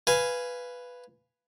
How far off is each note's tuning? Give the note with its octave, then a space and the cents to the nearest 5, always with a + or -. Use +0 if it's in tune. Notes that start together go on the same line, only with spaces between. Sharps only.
B4 +0 F5 -10 G#5 +0